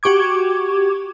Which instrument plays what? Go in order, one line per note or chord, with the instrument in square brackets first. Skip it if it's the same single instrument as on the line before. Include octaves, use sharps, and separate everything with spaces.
[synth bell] F#4 G4 C#6 D6 G#6